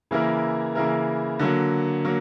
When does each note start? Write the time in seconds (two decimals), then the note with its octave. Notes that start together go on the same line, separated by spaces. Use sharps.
0.11 C#3 E3 A#3 E4 A#4
0.75 C#3 E3 A#3 E4 A#4
1.39 D3 F#3 A#3
2.04 F#3 A#3